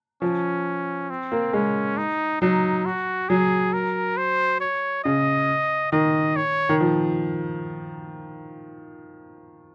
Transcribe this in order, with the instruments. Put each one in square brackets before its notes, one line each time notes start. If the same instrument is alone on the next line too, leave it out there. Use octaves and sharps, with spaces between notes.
[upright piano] F3 [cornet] C#4
[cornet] C4
[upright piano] A#3
[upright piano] G#3 [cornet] C#4
[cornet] D#4
[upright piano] F#3 [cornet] D#4
[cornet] F#4
[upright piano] F#3 [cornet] G#4
[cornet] A#4
C5
C#5
[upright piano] C#3 [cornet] D#5
[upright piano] D#3 [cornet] D#5
[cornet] C#5
[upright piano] D#3
F3